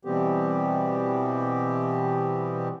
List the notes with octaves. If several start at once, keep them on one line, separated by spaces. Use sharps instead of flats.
B2 E3 G3 B3 C4 G4